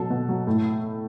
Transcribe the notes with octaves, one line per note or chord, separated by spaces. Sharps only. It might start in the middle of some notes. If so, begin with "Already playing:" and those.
Already playing: B2 F#3 A4
B2
F#3
A2